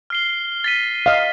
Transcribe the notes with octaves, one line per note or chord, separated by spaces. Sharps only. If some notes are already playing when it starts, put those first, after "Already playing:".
F6 C7 G7
A6 B6 D#7
D#5 F5